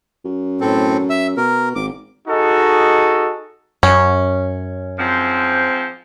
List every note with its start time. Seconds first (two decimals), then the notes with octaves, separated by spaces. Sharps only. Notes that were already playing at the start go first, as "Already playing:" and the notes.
0.25 F#2
0.61 A2 C4 A4
1.10 E5 E6
1.37 B2 A#4
1.76 G#1 D6
2.28 D#4 F#4 G#4 A4 D#5
3.83 F#2 C#4
4.98 G#2 F3 C4